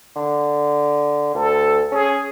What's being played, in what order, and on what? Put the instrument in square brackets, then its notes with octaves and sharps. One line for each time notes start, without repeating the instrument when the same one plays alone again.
[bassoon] D3
[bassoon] D2 [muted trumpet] A4
[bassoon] C#4 [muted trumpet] G#4